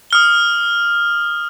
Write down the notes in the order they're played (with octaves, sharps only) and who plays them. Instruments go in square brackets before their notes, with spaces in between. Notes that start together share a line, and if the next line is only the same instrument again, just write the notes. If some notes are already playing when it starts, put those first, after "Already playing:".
[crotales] D#6 F6 G7